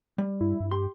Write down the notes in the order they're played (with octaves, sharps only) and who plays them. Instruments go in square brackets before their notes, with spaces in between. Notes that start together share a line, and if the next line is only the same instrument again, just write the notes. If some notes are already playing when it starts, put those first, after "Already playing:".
[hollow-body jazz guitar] G3
[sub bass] G2 [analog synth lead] E4
[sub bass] G2
[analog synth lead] G4 [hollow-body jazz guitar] C6